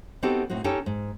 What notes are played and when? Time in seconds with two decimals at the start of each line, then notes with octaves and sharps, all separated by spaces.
0.23 B3 C4 D#4 F#4 G4 A4
0.50 A2 C4 D#4 F#4
0.64 C#4 D#4 G4 A4 C#5 G5
0.86 G#2